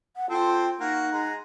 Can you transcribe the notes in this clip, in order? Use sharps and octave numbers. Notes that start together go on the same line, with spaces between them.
F#5
C4 F4 A4 C5 G5
A#3 D#4 F#4 F#5
G#3 A#5